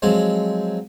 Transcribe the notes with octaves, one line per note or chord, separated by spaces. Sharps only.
F3 F#3 G#3 C4